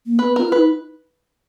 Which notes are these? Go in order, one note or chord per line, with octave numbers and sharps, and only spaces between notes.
A#3
B3 B4
F4 A#4
E4 B4
D#4